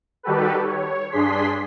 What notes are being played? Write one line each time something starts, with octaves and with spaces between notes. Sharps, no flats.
D#3 G3 F#4 G4 A4 B4
C#5
G2 D4 G#4 C6 B6